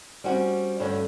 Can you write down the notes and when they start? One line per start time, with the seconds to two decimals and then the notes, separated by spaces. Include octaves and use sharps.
0.24 G3 C4 C#4 F#4
0.79 D2 G2 D3 C#4 F#4